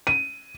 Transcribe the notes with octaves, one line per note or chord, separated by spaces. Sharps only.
D#7